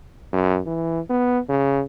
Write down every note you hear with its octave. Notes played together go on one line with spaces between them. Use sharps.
F#2
E3
B3
C#3